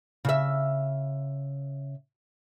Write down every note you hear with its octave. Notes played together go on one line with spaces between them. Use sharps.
C#3 E5